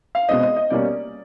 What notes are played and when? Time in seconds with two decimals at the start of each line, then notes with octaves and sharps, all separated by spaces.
0.15 F5
0.29 B2 G#3 C4 D#5
0.43 D#5
0.57 D#5
0.70 B2 G3 A#3 C#4 D5